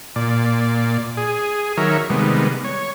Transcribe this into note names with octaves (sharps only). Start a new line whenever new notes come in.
A#2 D5
G#4
D#3 F#3 A#4 C#5 E5
C3 D#3 G3 G#3 B3
C#5